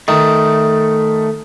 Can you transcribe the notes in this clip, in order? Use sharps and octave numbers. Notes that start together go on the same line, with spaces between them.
D#3 A3